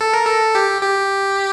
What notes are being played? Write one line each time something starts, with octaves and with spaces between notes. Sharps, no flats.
A4
A#4
A4
G4
G4